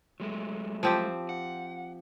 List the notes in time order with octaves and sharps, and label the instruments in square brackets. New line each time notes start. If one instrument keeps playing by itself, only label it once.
[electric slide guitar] F#3 G#3 A3
[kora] F3 C4 G4
[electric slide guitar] F#5